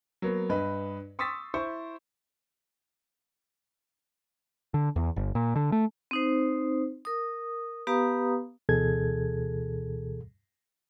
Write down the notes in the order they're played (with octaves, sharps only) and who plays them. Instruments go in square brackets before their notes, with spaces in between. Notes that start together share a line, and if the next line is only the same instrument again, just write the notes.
[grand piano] F#3 A#3 B3
G2 B4 D#5
C6 C#6 D#6 E6 A6 B6
E4 C5 C#6
[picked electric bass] D3
E2
G1
A#2
D3
A3
[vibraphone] C4 D#4 C5
A#4 D#6
B3 G4 B4 F5 A#5 D#6
[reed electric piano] D2 B2 E3 G#4 A4 G#6